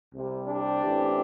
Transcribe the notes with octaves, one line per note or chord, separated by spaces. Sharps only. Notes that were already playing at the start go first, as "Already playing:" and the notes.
C2 C3 G3
D4 G4
A1 A2 E3 C4